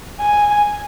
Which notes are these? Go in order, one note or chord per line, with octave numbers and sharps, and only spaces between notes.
G#5